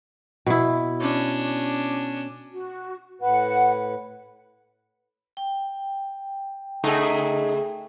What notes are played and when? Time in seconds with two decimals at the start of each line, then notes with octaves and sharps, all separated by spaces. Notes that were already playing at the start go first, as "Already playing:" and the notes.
0.46 B2 E4
1.00 C#4 D4
2.52 F#4
3.22 A2 B4 F#5
5.37 G5
6.84 C#3 A3 D#4 G#4